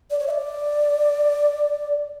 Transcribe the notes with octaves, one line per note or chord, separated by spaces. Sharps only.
D5
C#5
E5
D5